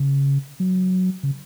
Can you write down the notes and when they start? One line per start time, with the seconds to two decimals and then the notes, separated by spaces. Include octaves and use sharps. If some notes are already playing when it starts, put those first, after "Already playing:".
Already playing: C#3
0.60 F#3
1.23 C#3